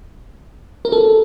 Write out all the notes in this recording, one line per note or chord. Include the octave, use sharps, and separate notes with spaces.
A#4
A4